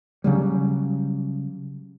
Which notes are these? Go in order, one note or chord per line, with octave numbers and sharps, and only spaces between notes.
C#3 F#3 G3